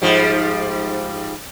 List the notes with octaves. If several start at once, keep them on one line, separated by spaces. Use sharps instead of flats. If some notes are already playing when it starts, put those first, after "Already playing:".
G#2 F3 G3